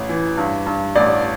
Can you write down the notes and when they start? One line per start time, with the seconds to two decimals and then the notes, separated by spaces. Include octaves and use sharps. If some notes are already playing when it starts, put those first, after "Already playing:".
Already playing: A1
0.09 E3
0.37 G2
0.66 G2
0.95 A1 D5